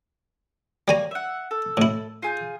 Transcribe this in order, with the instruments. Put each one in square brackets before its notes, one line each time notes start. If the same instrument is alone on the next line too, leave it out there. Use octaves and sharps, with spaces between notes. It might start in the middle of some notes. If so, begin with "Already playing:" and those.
[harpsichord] G3 G#5 A#5 [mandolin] A#3 C#5
[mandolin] E5 F#5
A4
[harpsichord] A2 E4
[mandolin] F4 G#4 G6